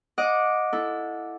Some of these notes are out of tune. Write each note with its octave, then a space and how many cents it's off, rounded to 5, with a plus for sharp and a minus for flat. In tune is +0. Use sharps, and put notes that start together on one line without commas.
D#5 +0 F#5 -25 D6 +0
E4 +0 A4 +0